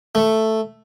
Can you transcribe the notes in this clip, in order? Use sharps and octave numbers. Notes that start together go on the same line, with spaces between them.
A3